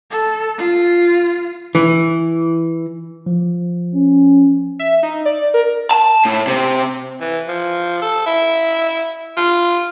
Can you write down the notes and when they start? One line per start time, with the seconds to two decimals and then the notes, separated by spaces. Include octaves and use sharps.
0.11 A4
0.58 F4
1.75 E3
3.26 F3
3.95 C#4
4.79 E5
5.03 D#4
5.25 D5
5.54 A#4
5.91 A5
6.25 A2
6.47 C3
7.20 E3
7.48 F3
8.02 A4
8.26 E4
9.37 F4